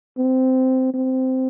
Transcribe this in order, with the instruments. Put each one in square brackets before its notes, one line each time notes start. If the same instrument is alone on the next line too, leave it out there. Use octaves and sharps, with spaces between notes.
[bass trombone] C4
C4